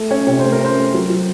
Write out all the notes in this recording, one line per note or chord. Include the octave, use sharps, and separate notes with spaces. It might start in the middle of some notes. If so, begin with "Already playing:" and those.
Already playing: A3
C#4 C#5
C3 C#5
A3 C5
A#4
C#4 C5
A3
F#3
F#3